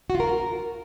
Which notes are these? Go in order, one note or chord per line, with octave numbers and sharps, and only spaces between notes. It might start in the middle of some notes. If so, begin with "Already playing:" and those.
F#4
F4
A#4